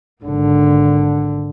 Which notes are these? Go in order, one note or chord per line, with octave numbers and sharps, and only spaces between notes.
G#1 D3